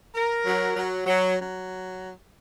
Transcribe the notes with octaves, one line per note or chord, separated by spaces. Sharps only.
A#4
F#3
F#3
F#3
F#3